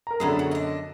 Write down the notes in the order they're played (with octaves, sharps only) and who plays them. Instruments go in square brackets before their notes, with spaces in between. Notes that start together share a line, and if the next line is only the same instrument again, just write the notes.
[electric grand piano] A#4 A#5
[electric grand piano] F#2 D3 [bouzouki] A3 B3 G#4
[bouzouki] F#4
D4 D#5